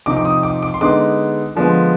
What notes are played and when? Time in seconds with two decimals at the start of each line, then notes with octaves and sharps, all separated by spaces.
0.06 C3 F3 C4 D#4 D6
0.17 D6
0.25 D#6
0.43 D6
0.63 D6
0.74 C6
0.81 D3 G#3 B3 D#4 D6
1.55 D3 F3 G#3 B3